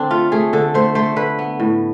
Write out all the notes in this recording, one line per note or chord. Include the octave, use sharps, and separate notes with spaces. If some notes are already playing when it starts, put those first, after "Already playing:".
Already playing: D3 C4 D4
A3 F4
A3 G#4
D3 A4
A3 C5
A3 C5
D3 B4
B3
A2